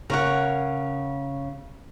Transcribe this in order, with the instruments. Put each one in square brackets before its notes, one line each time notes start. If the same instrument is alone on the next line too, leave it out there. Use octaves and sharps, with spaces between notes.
[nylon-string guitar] C#3 [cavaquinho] A#4 C#5 F#5